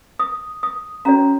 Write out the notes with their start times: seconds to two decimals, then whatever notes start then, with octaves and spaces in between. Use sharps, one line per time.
0.19 D#6
0.63 D#6
1.05 C#4 F#4 A4 C#5 A#5